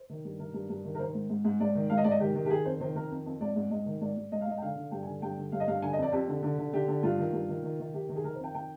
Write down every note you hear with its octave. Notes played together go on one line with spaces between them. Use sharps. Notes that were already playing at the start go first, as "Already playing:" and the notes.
Already playing: C5
D#3
G2
D#3 A#4
G2
G2
D#3
A#4
D#3 C5
G#2
G#2
G#2
G#2 D5
D#3
G#2 F5
D#5
G#2 D5
D#5
D#3 G4
D#3
G4
D#3 G#4
F2 C5
D#3 C5
D#3 A#4
F2
F2
G#2 D5
G#2
G#2 D#5
D#3
G#2 D5
G#2
G#2 D#5
F5
G#2 D#5
G5
D3 F5
D3
G2 G5
G#5
D3
G2 G5
D3
G2 F5
D#5
G2 F5
D3 G#5
D#5
F2 D5
F2 G4
D3
D3
D3
D3 G4
D3
G2 F4
D#3
G2
D#3
D#3
D#3
D#3 G4
D#3
G#4
D#3 A#4
C5
F2 G5
D#3 G5